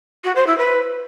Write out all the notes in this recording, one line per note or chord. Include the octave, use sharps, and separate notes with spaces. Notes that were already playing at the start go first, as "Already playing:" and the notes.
F#4
C5
E4
B4